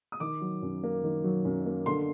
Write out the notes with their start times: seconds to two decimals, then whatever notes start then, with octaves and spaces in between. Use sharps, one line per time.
0.12 D#6
0.20 D#3 D6
0.41 F#3
0.63 F#2
0.84 A#3
1.04 D#3
1.24 F#3
1.45 F#2
1.66 A#3
1.86 D3 C6